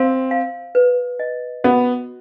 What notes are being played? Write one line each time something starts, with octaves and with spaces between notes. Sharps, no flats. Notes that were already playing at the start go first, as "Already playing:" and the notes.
Already playing: C4 F5
F5
B4
D#5
B3 F#4